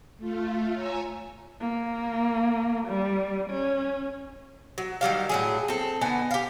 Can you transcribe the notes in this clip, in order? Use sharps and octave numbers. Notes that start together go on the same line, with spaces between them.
A3 F4
C#5 G#5 A#5 E6
A#3
G3
C#4
F#3
D#3 F#3 G3 F5
A2 F#3 G#4
C4 A4
D3 B3 D#4 G#5
G4 F5